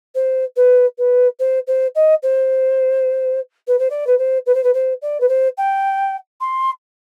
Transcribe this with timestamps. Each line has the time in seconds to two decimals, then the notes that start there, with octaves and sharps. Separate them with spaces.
0.15 C5
0.56 B4
0.98 B4
1.39 C5
1.67 C5
1.95 D#5
2.23 C5
3.68 B4
3.79 C5
3.90 D5
4.07 B4
4.18 C5
4.46 B4
4.55 C5
4.64 B4
4.74 C5
5.02 D5
5.20 B4
5.29 C5
5.58 G5
6.41 C6